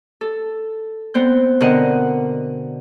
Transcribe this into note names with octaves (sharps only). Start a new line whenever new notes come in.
A4
B3 C4 C5 G6
B2 D3 C4 A#4 D#5 F#5